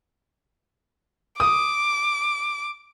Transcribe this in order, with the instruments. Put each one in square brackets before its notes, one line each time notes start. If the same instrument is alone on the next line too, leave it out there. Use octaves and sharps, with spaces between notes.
[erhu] D6 [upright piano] D#6